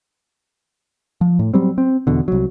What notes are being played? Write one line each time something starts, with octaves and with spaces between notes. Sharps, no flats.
F3
A2
F#3 G3 C4
C4
E2 B2 D3
C2 F#3